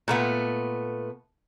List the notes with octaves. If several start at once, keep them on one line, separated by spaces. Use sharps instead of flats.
A#2 A3 B3